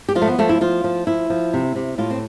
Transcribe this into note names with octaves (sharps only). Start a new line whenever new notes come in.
G4
F3 F4
A3
B3
F3 A3
E4
F3 F4
F3
F3 E4
F3
C3
C3
A2 F4
C4